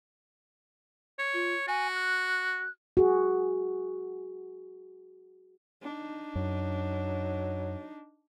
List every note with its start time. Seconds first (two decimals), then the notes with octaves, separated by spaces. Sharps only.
1.19 C#5
1.33 F4
1.68 F#4 G#5
1.95 F#6
2.97 F#4 G#4
5.82 D4 D#4
6.35 F#2 F#3